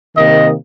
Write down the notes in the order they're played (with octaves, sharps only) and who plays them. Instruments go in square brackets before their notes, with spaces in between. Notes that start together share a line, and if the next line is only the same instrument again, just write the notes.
[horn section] C3 D#3 A#3 D#5